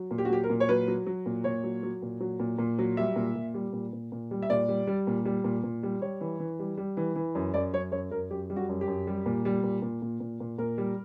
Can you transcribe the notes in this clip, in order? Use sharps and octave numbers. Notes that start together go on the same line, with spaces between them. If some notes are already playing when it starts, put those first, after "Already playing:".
Already playing: F#3
A#2
G4
F#4
F#3 G4
A#4
A#2
C#5
F#3 B4
F#3
F#3
A#2
A#2 C#5
F#3
F#3
A#2
F#3
A#2
A#2
F#3
G3 E5
A#2
A#2
G3
A#2
A#2
A#2
G3
E5
A#2 D5
G3
G3
A#2
G3
A#2
A#2
G3
G3 C#5
E3
E3
G3
G3
E3
E3
F#2
F#2 D5
F#2 C#5
F#2 C#5
F#2 A#4
F#2 G4
G3
F#4
F#2
G4
F#2
G3
A#2
G3
A#2
A#2
A#2
A#2
A#2
A#2 A#4
G3